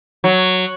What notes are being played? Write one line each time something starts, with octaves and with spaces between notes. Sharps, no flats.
F#3